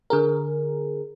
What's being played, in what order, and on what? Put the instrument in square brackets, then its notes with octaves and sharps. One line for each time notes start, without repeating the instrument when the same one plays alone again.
[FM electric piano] D3 G#4 A#4